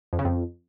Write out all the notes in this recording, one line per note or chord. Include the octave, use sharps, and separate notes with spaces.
F2
C#3
F2